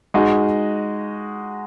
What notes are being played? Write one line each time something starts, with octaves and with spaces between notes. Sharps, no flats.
G#3 D#4 F#4